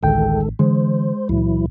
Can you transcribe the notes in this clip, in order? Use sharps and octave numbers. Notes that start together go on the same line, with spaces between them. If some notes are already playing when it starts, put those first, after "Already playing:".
A1 D2 D#3 G#3 A4 G5
D3 E3 G#3 C5
C#2 A#2 E3 F#3 E4